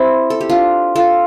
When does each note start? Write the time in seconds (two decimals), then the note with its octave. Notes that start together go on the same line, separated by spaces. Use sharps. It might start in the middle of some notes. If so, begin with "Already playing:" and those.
Already playing: C4 E4 G4
0.30 A4
0.41 G4
0.49 D4 F4
0.96 F4 A4